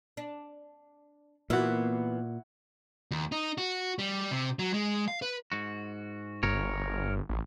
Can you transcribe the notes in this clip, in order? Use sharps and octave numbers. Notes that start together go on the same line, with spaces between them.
D4
A#2 E3 A#3 B3 E4 F#4
D#2
D#4
F#4
G3
C3
F#3
G#3
F5
B4
G#2 F#4
G1 A#4 C#5
A1